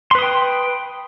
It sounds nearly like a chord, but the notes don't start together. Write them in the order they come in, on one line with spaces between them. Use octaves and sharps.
C6 B4 D#6 G5